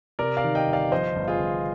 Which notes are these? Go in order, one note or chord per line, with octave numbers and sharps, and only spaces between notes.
C3 A#4 D5
D5 F5
D#3
D#5 G5
G1
D5 F5
F3 C5 D#5
G1
F4 G#4
G1